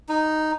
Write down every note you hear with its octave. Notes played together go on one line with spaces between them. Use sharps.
D#4